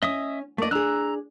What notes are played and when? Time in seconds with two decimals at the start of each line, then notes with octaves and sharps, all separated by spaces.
0.03 C#4 D#5 E5 D#6
0.58 A3 A#3 D5 D#5
0.71 D4 G#4 A#5 E6 F#6